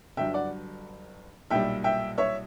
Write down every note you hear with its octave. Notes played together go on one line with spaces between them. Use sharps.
G1 G2 F#3 E5 G5
D5 F#5
B1 A#2 G3 E5 G5
E5 G5
C#5 E5